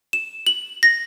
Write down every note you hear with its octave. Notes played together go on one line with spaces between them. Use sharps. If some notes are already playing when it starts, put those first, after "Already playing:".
E7
F#7
A#6